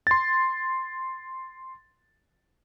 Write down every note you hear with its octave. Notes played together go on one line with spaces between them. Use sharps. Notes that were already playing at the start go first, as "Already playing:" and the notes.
C6 A6